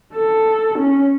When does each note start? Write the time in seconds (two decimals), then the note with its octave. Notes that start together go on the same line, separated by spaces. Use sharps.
0.15 A4
0.78 C#4